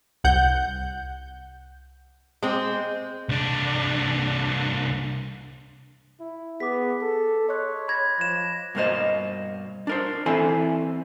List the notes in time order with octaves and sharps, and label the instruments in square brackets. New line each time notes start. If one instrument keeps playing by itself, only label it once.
[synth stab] C2 F#5 G6
[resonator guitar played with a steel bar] G#3 C4
[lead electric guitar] C2 D4
[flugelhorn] E4
[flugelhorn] B3 [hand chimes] G#4 [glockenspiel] D6 B6
[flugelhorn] A4
[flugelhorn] C#5 [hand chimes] D#5 C6 F#6
[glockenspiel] B5 G#6 A#6
[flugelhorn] F3 [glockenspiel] A#6 E7
[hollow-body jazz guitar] G2 B2 A#3 B3 C5 D#5
D4 A#4 C5
E3 C4 E4 A4 G#5 C6